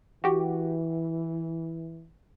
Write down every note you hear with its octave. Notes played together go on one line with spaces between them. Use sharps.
E3 F#4 G4